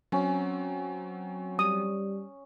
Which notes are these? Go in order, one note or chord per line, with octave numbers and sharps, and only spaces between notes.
F#3 C4 C#4
G3 D#6